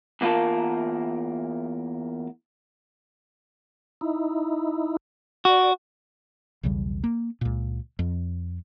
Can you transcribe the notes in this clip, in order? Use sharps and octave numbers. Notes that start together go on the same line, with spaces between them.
E2 A#3 F4 A#4 A5
D#4 E4
F#4 D5
B1 E2 C#3 G3
A#3
C#2 A#2
F2